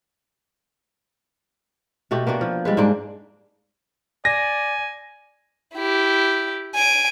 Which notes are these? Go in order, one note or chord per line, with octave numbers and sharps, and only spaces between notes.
B2 A3 F#4 G4
A#3 B3 D4 F#4
F3
G3 G#3 B4
G#2 A#3 D4
D5 G#5 A#6
E4 G4
G#5 D7